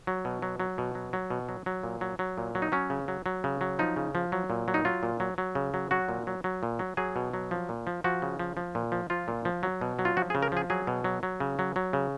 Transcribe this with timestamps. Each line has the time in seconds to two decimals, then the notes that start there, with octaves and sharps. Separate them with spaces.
0.07 F#3
0.25 B2
0.42 F#3
0.60 F#3
0.78 B2
0.95 F#3
1.13 F#3
1.30 B2
1.49 F#3
1.66 F#3
1.83 A#2
2.01 F#3
2.19 F#3
2.38 A#2
2.55 F#3
2.62 D#4
2.72 F#3 C#4
2.90 C#3
3.08 F#3
3.26 F#3
3.44 C#3
3.61 F#3
3.79 F3 D#4
3.96 C#3
4.15 F3
4.32 F#3
4.50 A#2
4.68 F#3
4.74 D#4
4.85 F#3 F4
5.03 A#2
5.20 F#3
5.38 F#3
5.55 C#3
5.74 F#3
5.91 F#3 F#4
6.09 A#2
6.27 F#3
6.44 F#3
6.63 A#2
6.79 F#3
6.97 F#3 G#4
7.16 B2
7.34 F#3
7.51 F3
7.69 A#2
7.87 F3
8.04 F3 F#4
8.22 C#3
8.39 F3
8.57 F3
8.75 A#2
8.92 F3
9.10 F3 F4
9.28 A#2
9.45 F3
9.63 F#3
9.81 B2
9.99 F#3
10.05 F4
10.17 F3 F#4
10.30 G#4
10.35 C#3
10.42 A#4
10.52 F3 G#4
10.70 F#3 G#4
10.87 B2
11.04 F#3
11.23 F#3
11.40 C#3
11.59 F#3
11.76 F#3
11.93 C#3